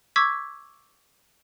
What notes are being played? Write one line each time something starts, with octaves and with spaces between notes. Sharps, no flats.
C#6 D6 E6 G#6 B6